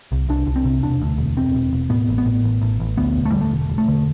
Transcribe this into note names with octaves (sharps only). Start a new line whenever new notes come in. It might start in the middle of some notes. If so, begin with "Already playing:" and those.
C2
C2 D4
C2
C4
C3
E1 D4
D2
E1
E1 C4
E1
E1
A2 B3
A1
B3
A2
A1
A1
A1
D2 B3
E1
A3
D3 G3
A3
E1
E1
A3
D3